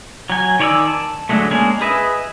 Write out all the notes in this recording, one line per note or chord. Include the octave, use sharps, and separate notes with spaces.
F#3 G#5
D#3 C#5 D5 G#5 E6
A5
D3 F#3 G#3 A3
G#3 A#3 C#4 D4 G#4
G#4 B4 D#5 E5